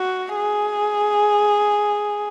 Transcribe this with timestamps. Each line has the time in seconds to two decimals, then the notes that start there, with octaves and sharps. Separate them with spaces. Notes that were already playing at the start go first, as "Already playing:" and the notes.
Already playing: F#4
0.36 G#4